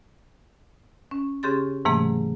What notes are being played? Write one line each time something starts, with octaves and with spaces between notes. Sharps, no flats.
C#4
C#3 C#4 G4 G#4 C6 A6
G#2 C3 E3 F#3 A3 A#3